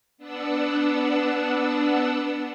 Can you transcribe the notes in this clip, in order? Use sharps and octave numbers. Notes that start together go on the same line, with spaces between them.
B3 D4 F#5 E6